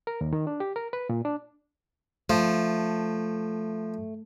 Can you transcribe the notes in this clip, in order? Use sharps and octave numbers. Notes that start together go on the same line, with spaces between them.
A#4
D#2
D#3
D4
G4
A#4
B4
A#2
D4
F3 A3